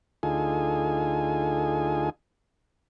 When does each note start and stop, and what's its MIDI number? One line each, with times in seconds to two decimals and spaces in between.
0.23 2.10 38
0.23 2.10 63
0.23 2.10 65
0.23 2.10 68
0.23 2.10 69
0.23 2.10 80